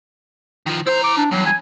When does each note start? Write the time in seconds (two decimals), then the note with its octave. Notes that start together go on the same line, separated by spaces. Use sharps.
0.67 D#3 F3
0.87 E4 C5 A#5
1.04 D6
1.17 D4
1.31 E2 G2 F#3
1.45 G#5